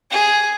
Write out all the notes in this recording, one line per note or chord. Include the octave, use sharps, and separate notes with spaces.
G#4